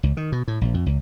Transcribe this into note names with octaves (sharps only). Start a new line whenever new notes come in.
C#2
D#3
B2
A2
A#1
F2
C#2